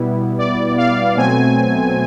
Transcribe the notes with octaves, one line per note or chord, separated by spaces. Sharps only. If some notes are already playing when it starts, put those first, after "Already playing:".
Already playing: B2 G3 B3 E4
D5
F5
B2 F#3 A3 C4 G#5